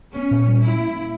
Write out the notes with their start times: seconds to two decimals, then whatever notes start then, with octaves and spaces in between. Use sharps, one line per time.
0.16 B3 C#4
0.31 A#2
0.48 G3
0.63 C#4 E4
0.80 A#3
0.95 A#3